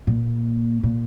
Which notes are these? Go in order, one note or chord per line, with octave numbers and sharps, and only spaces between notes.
A#2
A#2